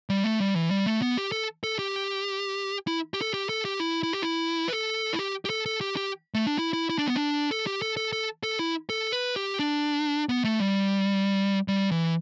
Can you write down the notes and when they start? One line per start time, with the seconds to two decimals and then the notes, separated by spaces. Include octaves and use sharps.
0.10 G3
0.24 A3
0.40 G3
0.56 E3
0.71 G3
0.86 A3
1.02 B3
1.17 G4
1.32 A4
1.64 A4
1.79 G4
2.87 E4
3.14 G4
3.21 A4
3.34 G4
3.49 A4
3.65 G4
3.80 E4
4.03 E4
4.13 G4
4.22 E4
4.68 B4
4.73 A4
5.13 E4
5.19 G4
5.45 G4
5.50 A4
5.66 A4
5.81 G4
5.97 G4
6.34 A3
6.46 D4
6.58 E4
6.73 E4
6.90 E4
6.98 D4
7.07 B3
7.16 D4
7.51 A4
7.67 G4
7.82 A4
7.97 A4
8.13 A4
8.43 A4
8.59 E4
8.90 A4
9.12 B4
9.36 G4
9.59 D4
10.29 B3
10.44 A3
10.60 G3
11.68 G3
11.91 E3